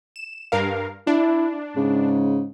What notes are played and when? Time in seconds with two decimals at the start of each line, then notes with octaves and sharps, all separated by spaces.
0.16 E7
0.52 G2 A#4 F5
1.07 D4 E4
1.76 G#2 C#3